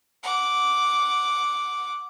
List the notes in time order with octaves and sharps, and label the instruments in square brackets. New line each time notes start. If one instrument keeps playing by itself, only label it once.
[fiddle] F#5 D6